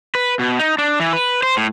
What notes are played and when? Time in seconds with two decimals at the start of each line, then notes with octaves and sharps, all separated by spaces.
0.15 B4
0.39 B2
0.59 D#4
0.78 D4
1.00 E3
1.13 B4
1.43 C5
1.57 A2